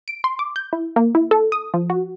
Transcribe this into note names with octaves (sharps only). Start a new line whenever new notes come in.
D7
C6
D6
G6
E4
A#3
E4
A4
D#6
F3
F#4